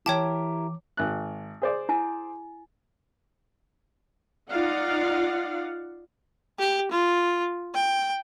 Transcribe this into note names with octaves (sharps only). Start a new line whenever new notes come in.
E3 E4 G4 A#4 C#5 G5 A5 D6
G#1 F#6
G#4 C5 D5
E4 G#5
D#4 F4 D5 F5 F#5
G4
F4
G5